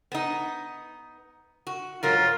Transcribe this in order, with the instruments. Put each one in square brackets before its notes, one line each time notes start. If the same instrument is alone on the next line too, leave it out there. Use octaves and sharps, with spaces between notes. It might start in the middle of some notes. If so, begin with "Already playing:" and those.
[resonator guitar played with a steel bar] B3 D#4
F#4
[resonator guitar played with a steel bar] G#2 F#3 A#4 [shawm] F4